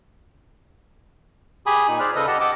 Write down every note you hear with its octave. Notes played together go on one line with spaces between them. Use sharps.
G4 G#4 G#5 B5 D#6
A#2 D#4
G#4 C5 D5 F6 F#6
C#3 A4 B4 D#5 D#6 F6
G4 D#5 F#5 A5
G4 D#5 F#5 D6 E6